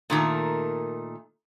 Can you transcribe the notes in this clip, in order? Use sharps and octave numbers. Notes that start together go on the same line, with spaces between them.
A#2 D#3 A3